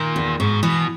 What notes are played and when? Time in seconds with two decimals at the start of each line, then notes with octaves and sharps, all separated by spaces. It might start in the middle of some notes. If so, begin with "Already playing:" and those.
Already playing: A#2 D#3
0.16 E2
0.40 G#2 B2
0.63 B2 E3